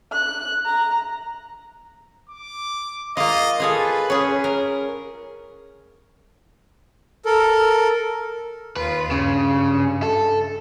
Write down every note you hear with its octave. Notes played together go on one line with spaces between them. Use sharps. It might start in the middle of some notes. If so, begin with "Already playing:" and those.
F#6
A#5
D6
A#3 F4 D#5
F4 G#4 A4 B4
C#4 G#4
A#4
A4 A#4
D#2 F4 B4
G2 C#3
A4